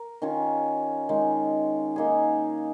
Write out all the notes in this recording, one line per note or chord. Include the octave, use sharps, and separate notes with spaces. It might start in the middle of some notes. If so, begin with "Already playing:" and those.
Already playing: A#4
D#3 C#4 F4 C#5
D#3 G#3 D#4
A#3 D#4 G#4